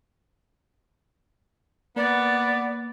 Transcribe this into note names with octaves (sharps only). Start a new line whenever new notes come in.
A#3 B3 D5